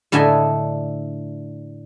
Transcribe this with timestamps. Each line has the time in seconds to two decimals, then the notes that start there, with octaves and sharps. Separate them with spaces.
0.12 A2 D3 A4 D#5 E5 G#5